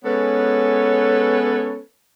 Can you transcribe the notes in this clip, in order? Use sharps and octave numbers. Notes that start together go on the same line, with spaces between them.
G#3 B3 C#4 A4 B4 C#5